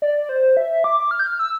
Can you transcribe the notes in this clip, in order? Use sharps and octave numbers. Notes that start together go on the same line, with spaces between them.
D5
C5
E5
D6
F6
G6
F6
E6